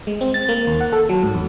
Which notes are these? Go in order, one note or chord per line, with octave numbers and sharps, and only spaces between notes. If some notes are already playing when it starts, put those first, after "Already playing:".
G#3
C4
A6
A#3
D#2
F#5
A4
F#3
G#2
E2